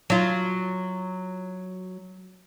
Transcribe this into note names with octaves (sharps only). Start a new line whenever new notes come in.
F#3 F4